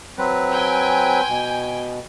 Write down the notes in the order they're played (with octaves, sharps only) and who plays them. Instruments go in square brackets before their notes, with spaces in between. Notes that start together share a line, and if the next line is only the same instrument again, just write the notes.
[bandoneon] F#3 C4 B4
[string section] G5 G#5
[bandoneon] B2